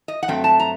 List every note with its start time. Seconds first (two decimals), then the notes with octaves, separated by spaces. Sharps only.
0.08 D#5
0.23 F#5
0.28 G2 F#3 A3 C4 G5
0.44 A5
0.59 A#5